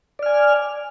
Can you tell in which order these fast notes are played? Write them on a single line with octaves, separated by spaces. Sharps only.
D5 F6 G#5